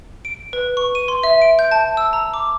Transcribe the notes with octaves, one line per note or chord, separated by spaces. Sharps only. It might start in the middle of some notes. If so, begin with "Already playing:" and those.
D7
B4
C#6
D#7
C6
E5
D7
G6
A5
E6
A#5
D6